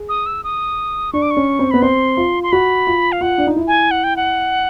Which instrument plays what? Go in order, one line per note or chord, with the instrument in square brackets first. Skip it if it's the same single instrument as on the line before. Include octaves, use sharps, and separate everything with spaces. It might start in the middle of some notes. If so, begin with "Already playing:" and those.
Already playing: [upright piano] G#4
[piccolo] D#6
E6
D#6
[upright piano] D4 [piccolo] C#6
[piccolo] D6
C#6
[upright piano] C#4
C4
[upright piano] B3 [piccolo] B5
[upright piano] C4 [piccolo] C6
[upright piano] F4
[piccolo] C6
[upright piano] F#4 [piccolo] B5
[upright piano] F4
[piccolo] F5
[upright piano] F4 [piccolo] F#5
[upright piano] D4
D#4
E4
[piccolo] G#5
F#5
G5
F#5